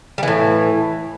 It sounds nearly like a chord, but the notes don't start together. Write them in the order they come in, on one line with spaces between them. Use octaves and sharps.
G3 E3 A2